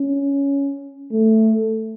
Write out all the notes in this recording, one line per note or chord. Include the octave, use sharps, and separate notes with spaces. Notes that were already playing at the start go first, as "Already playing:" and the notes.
Already playing: C#4
A3